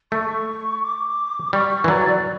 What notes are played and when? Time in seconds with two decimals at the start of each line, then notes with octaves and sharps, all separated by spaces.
0.12 A3 C#6
0.83 D6
1.53 G3 C#6
1.70 C#6
1.84 E3
1.88 F#3 D5